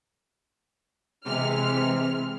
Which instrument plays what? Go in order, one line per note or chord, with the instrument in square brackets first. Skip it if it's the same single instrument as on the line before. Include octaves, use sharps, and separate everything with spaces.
[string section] C3 E3 G#3 F6